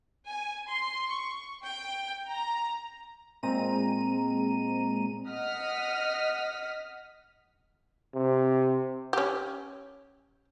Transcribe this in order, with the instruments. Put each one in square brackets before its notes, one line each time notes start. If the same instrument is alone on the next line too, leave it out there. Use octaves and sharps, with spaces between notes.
[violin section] G#5
C6
C#6
G5
A#5
[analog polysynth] A#2 G#3 C4 A#5 D#7
[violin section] D#5 F#5 D#6 F6 B6
[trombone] C3
[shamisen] C#4 G4